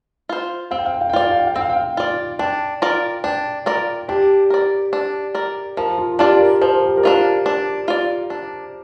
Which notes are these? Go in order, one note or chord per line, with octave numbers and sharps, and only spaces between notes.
F4 C5
C4 F5
G5
F5
G5
F5
G5
F4 D5 F5
G5
F5
G5
F5
C4 G5
F5
G5
F5
F4 D5
D4 G5
F4 A#4 D5
D4 G5
F4 A#4 D5
D4 G4
A#4 D5
D4
A#4 D5
F3 A#4
F4
D4 F4 G4 D5
A#4
F3 C5
A#4
G4
A#4
D4 F4 D5
D4
F4 D5
D4